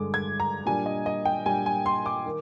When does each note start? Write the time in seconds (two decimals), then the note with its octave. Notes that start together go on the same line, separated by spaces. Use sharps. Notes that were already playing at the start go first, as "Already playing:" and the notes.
Already playing: G2 D3 G#3 D6
0.14 G#6
0.40 A#5
0.66 A#2 G3 D4 G#5
0.86 D#5
1.06 D#5
1.25 G5
1.46 A#2 G3 D4 G#5
1.66 G#5
1.86 C6
2.06 D6
2.26 D#3